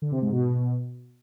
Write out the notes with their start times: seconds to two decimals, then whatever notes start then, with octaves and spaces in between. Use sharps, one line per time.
0.02 D3
0.12 C3
0.22 G#2
0.32 B2